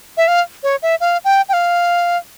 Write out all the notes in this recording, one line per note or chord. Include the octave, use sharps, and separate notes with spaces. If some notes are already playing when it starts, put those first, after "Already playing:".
E5
F5
C#5
E5
F5
G5
G5
F5